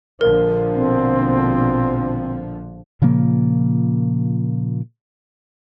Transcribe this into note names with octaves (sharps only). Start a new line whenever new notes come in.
A#1 D3 F3 A#4
B2 C4
A#2 C#3 F3 A#3